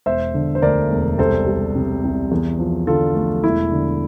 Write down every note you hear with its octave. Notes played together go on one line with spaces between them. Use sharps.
E1 C5 E5
D3
C5
D2 A#4 D5
E1
C2 A4 C5
G3
C3
C2
E2
F3
D3 F4 A4
A3
E1 E4
D3